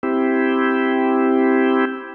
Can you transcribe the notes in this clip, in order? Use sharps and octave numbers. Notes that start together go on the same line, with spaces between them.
C4 E4 G4